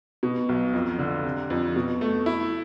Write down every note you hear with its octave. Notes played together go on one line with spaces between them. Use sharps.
B2
B1
F2
D3
C3
F2
B2
A3
E4